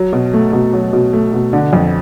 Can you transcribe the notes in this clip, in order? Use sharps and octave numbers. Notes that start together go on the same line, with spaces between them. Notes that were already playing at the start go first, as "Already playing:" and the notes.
Already playing: F#3
B2
A3
B2
F#3
B2
A3
B2
D3
F2